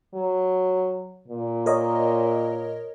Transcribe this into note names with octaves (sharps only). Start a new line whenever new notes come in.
F#3
A#2
A#4 C#5 D#5